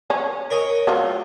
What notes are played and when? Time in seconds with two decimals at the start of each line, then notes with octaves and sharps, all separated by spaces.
0.10 C#4
0.51 A#4 C#5 D#5
0.87 F#3 A3 F4